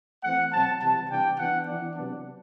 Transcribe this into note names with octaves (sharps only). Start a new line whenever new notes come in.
E3 A3 C4 F#5
B2 F#3 C4 A5
C3 E3 G3 A5
C3 E3 G3 D4 G5
E3 B3 D4 F#5
E3 B3 D4
C3 F#3 B3 D4